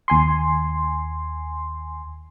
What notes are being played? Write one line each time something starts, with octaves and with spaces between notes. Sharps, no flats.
D#2 G#5 C6